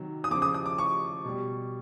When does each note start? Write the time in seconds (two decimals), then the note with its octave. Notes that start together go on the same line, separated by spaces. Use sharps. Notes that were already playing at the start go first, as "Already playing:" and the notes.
Already playing: C3 D#3 F#3
0.24 D#6
0.31 F3 D6
0.35 C#3
0.42 D#6
0.54 D#6
0.66 D6
0.78 C#6
1.25 B2 G3